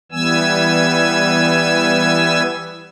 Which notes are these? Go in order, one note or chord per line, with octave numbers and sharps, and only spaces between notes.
E3 G3 B3 G#5 E6